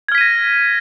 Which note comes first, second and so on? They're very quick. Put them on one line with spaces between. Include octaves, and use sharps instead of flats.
G#6 F6 B6 D#7 A#6